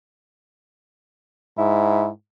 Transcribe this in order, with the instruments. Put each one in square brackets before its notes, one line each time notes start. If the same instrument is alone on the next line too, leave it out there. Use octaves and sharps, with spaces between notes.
[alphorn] G#2 [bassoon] E4